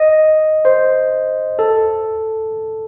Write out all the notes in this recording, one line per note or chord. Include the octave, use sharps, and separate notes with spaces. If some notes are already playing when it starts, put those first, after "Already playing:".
Already playing: D#5
C5
A4